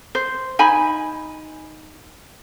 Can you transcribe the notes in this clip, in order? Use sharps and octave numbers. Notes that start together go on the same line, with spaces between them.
C5
D#4 G#5 B5